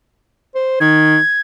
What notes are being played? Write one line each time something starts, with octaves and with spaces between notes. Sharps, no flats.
C5
D#3 G#6